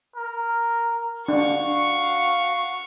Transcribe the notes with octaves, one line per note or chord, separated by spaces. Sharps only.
A#4
D4 F#4 F5 C#6